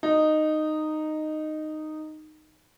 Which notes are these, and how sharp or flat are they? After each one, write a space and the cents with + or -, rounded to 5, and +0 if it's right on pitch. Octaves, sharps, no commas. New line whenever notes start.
D#4 -10